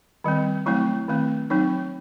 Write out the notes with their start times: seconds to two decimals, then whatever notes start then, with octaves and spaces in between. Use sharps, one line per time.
0.24 D#3 G3 C4
0.66 F#3 A3 C4 E4
1.08 D#3 A3 C4
1.50 F#3 C4 D#4